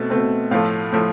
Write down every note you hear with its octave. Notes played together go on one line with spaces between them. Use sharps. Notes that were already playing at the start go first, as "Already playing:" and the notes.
Already playing: B2 A3 C4 E5
B2 A3 C4
A2 F3 A3 F5
A2 F3 A3